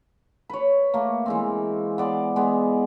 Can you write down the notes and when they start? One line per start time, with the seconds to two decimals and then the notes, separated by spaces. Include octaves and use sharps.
0.50 B4 C#5
0.94 A3 A#3
1.26 E3 G#3 C4
1.98 B3 D5 C6
2.36 G#3 B3